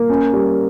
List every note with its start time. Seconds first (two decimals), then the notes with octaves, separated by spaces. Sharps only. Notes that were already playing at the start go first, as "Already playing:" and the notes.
Already playing: A#3
0.10 C#4
0.33 G3